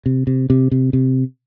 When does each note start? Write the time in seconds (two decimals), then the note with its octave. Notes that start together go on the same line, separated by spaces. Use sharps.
0.06 C3
0.27 C3
0.50 C3
0.71 C3
0.93 C3